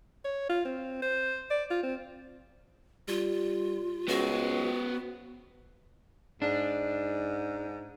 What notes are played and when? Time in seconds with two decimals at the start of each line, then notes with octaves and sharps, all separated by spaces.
0.24 C#5
0.49 F4
0.65 C4
1.02 C5
1.50 D5
1.70 F4
1.83 C4
3.08 G3 F4
4.08 C#2 B3 F#4 C5
6.42 G#2 D4